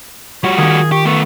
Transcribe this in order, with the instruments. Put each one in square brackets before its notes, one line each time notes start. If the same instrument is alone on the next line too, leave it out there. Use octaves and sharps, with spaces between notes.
[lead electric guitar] G3 F#4 [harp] F4 [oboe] C#5
[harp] D#3 D#4 [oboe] G#4
[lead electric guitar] G4 [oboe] C#6
[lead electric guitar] A3 B3 [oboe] C#6